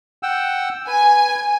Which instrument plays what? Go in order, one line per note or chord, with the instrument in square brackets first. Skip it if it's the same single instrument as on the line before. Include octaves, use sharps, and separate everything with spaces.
[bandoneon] F#5 G5 E6
[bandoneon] B4 [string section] G#5